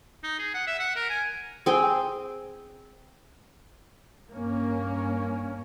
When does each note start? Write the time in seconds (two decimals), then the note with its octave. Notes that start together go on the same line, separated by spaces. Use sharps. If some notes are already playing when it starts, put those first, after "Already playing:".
0.24 D#4
0.39 G#4
0.54 F#5
0.67 E5
0.79 F#5
0.96 A#4
1.10 G#5
1.66 C4 G#4 G5
4.31 G2 A#3 C#4